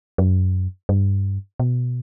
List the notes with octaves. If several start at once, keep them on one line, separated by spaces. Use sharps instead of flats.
F#2
G2
B2